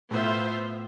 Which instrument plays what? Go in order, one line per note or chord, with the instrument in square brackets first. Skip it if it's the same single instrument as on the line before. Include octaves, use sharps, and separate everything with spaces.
[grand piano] A2 A3 [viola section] B3 F4 C5 E5